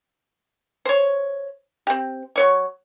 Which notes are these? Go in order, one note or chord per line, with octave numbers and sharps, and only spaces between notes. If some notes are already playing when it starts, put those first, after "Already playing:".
C5 C#5
C4 G4
F#3 C#5 C#6